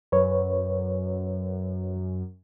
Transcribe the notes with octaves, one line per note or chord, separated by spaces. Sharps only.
F#2 B4 C#5